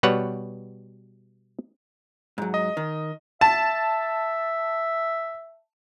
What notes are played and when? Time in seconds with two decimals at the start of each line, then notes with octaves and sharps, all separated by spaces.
0.03 B2 G3 B4 C#5 F#5
2.38 G#2 F#3
2.54 D#5
2.77 D#3
3.41 E5 A5